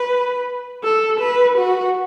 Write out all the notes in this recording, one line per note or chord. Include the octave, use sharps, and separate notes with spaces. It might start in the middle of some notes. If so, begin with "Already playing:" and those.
Already playing: B4
A4
B4
F#4